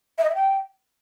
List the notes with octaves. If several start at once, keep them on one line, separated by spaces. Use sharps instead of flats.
E5
D#5
E5
G5